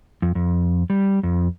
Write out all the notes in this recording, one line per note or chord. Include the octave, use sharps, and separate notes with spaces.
F2
F2
G3
F2